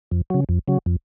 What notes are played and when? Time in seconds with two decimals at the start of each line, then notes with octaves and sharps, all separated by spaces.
0.11 F2
0.30 C#3 F#3
0.49 F2
0.68 C#3 F#3
0.86 F2